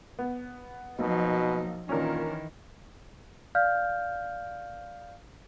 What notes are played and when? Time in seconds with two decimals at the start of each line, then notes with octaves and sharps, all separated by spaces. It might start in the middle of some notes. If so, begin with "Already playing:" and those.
0.19 B3
0.99 B1 B2 F3 A#3 D#4
1.89 A#2 D#3 E3 C#4 D4 A#4
3.55 D5 F5 F6 G6